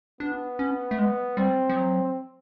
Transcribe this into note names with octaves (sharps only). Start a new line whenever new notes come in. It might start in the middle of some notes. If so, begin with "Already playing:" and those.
B3 D4
C#4
A3
G#3 B3
G3 C4
F3
F#3